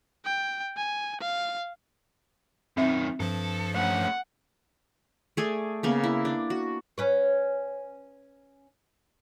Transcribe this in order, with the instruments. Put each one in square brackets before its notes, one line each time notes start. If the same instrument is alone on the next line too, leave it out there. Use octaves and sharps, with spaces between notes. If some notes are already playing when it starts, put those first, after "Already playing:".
[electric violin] G5
G#5
F5
[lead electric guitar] F#2 D#3 [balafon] C4 E5
[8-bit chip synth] G2 F3 [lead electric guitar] A4
[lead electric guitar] A3 C#4 [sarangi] F#5
[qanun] A3 G#4 D5
C#3 A#3 B3
E4
D4
F#4
[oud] C#4 B4 C#5